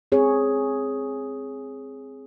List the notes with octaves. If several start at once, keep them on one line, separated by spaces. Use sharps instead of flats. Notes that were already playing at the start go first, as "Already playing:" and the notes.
C4 G#4 C#5